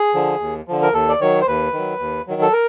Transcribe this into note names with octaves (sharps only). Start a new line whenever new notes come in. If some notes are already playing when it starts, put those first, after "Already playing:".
Already playing: G#4
D3 F3
D#2
D3 F3
A#4
D#2 A4
D5
D#3 F#3 C#5
C5
D#2 B4
D#3 F#3
D#2
D#3 F#3
A4
A#4